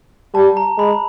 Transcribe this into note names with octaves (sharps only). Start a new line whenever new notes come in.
G3 A5
A#5
G#3 B5